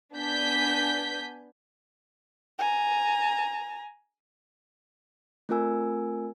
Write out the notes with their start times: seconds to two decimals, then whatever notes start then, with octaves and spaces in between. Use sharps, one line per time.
0.15 B3 D4 G#5 G6 B6
2.58 G#5 A#5
5.49 A3 C4 F4 A#4 G#5 E6